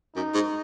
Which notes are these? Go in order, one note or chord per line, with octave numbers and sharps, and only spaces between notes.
F#2 D#4
G#2